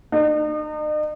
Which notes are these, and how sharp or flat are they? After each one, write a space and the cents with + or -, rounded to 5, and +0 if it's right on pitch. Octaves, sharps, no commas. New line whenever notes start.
D#4 -40